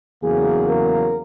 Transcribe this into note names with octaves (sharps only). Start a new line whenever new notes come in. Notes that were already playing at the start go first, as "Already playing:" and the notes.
E2 C#3 F#3 A#3 G#4
A#4